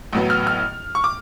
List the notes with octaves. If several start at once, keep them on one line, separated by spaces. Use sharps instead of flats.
A1 A2 F#3 B3
F6
F6
C#6
D6